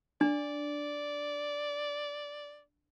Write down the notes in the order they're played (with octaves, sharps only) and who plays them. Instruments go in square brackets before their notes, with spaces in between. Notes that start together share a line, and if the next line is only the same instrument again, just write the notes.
[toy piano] D4 [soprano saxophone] D5